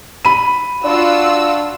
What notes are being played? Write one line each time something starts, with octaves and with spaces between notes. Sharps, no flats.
B5 D#7
D4 F4 F#4 E6